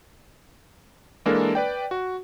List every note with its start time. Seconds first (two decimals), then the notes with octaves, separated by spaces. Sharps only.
1.26 E3 G#3 A#3 D4 A4 A#4
1.55 B4 D5 G5
1.91 F#4